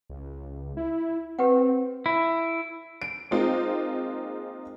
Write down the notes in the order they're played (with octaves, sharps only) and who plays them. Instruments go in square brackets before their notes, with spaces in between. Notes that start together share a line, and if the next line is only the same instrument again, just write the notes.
[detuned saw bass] C#2
E4
[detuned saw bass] C4 [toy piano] G4 B4 F#5
[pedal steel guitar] E4
[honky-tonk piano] D7
G#3 A#3 C4 D#4 F4 C5